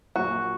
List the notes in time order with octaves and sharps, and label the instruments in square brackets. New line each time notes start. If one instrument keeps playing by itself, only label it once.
[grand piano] A#1 A#2 F#3 [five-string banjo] F#4